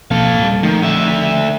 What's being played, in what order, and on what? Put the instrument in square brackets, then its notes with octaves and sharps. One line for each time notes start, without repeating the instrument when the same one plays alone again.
[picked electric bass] B2 F3 A#3 [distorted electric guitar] A4 F5
[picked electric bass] A#2 G3
[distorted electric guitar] D#3 [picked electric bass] F3 A3
[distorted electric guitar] D3 E5